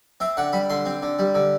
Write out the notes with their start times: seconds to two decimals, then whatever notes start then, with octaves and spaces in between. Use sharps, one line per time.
0.20 C4 E5
0.37 D3 F#5
0.53 G3 B5
0.70 D3 C6
0.86 C4
1.03 D3
1.19 G3
1.35 D3